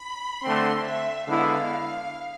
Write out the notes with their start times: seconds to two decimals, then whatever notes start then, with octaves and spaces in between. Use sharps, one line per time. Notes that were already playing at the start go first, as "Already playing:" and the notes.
Already playing: B5
0.43 D3 A3 C4 C6
0.85 E5
1.26 D3 G#3 B3 E4 F5